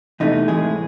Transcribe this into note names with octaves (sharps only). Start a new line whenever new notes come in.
E2 C3 E3 A3 D#4
A2 E3 G#3 G#4